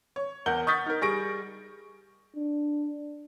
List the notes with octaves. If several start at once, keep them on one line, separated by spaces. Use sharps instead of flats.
C#5
E2 A#4 F#5 G6 G7
C#6 D#6 F6 G6 A6 B6
D#4 A#4
G3 G#4 C#6 A#6 D7
D4